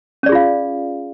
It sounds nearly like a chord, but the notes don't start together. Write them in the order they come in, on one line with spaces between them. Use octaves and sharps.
C#4 D5 G#4 F4 F5